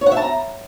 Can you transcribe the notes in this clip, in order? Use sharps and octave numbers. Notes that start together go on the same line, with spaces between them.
C#5
F#5
E5
A5
A#5